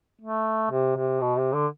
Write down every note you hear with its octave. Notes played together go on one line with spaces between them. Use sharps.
A3
C3
C3
B2
C3
D3